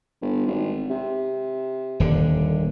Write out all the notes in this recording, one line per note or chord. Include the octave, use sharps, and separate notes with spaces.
G1
G#1
C3
D#1 D3